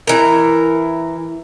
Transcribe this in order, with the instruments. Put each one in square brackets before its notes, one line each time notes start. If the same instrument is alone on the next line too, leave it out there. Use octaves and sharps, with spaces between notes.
[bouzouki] E3 A#5 [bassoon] A#4